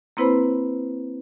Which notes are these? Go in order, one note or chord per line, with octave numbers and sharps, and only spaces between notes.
A#3 C4 E4 B4 C5 B5